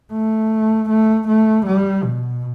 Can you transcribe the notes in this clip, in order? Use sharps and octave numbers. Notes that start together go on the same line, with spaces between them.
A3
A3
A3
G3
B2